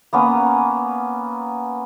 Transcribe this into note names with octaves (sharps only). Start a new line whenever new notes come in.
A#3 B3 C#4